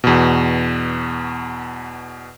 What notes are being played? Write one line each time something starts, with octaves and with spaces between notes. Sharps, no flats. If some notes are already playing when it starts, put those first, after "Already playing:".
E2 B2